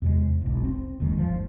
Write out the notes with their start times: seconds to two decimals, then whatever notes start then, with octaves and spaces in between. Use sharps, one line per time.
0.02 E2 C3 G#3
0.41 E1 B1
0.64 C4
1.00 D#1 D#2 D#3 G#3
1.18 G1 F3